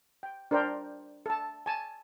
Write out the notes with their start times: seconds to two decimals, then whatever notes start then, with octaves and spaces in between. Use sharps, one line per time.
0.23 G5
0.51 D4 A#4 C5 D5 G5
1.26 A4 A5
1.66 G#5 A5